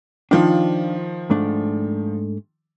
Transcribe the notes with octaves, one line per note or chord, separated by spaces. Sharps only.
D#3 F3 D4 F4
G#2 A3 D4